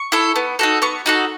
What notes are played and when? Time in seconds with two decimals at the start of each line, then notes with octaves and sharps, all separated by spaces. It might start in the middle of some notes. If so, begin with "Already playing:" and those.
Already playing: C#6
0.12 E4 A4
0.36 B3
0.59 D#4 F#4 A4
0.82 B3 C#6
1.06 D#4 F#4 A4